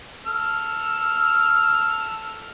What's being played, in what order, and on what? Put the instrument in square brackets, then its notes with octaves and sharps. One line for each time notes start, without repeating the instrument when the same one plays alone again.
[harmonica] A4 E6 F6